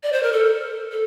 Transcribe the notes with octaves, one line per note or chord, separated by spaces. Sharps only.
D5
C5
A#4
A4
A4